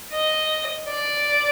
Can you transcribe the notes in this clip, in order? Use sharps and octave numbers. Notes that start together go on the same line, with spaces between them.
D#5
D5